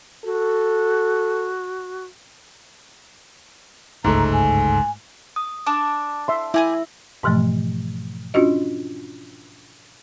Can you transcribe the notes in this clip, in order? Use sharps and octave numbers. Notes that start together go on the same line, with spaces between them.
F#4 A4
G1 C#2 G#2 A3 A#5
G#5
D#6
D4 A5 D6
E5 C6
E4 G4 G#4 E5 G#5
G#2 B2 E3 F3 A3
C#4 D4 F4 F#4 D#5